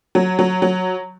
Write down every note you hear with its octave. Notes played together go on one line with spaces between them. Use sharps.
F#3
F#3
F#3